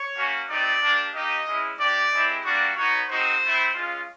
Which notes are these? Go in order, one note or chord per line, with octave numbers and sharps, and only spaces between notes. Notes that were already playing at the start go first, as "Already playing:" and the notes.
Already playing: C#5
A#3 C#4 F#4
A3 C4 D#4 G4 D5
A#3 D4 G4
A#3 D#4 G4 D#5
G#3 C#4 E4
A3 D4 G4 D5
G#3 C4 E4 G4
G3 A#3 D4 F#4
B3 D#4 F#4 C#5
G#3 C4 D#4 F#4 C5
A3 C4 E4
G#3 C#4 F4